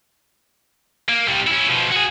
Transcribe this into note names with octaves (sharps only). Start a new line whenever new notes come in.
A#3
C3 G3
C#4 E4
B2 F3
F#4 G#4